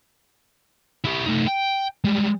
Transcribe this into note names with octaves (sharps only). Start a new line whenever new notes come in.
E4 G4
A3 D#4
G5
G3 G#3